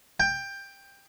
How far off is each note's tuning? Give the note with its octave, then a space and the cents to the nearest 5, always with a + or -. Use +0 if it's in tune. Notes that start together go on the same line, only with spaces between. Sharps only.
G5 +15